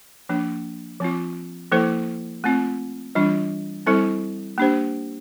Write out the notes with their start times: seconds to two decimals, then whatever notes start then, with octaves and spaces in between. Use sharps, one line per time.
0.29 F3 A#3 D4
1.00 F3 C4 F4
1.72 F3 A#3 E4 A4 C5
2.44 A3 C4 F4
3.15 E3 G3 D4 F4
3.86 G3 C4 E4 A4 C5
4.58 A#3 D4 G4 C5